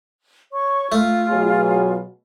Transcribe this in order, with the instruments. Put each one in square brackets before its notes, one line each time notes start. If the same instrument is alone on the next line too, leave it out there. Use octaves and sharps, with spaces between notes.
[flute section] C#5 C#6
[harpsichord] A3 [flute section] F4
[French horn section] B2 F#3 G#4